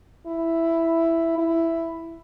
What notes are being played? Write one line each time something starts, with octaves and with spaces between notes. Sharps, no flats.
E4
E4